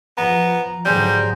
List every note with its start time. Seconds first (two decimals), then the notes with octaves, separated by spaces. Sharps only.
0.18 F3 B3 A#5
0.85 G#2 D3 F#3 G3 G#4 C5 A#5 G6